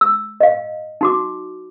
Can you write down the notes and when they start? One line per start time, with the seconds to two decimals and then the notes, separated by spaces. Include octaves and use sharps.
0.01 E6
0.41 D#5 F5
1.01 D#4 F#4 D6